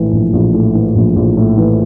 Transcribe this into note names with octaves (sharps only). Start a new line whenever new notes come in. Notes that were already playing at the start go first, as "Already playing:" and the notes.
Already playing: A#1 A2 E3
A#1
A#1
A2
E3
A#1
A#1
A2
E3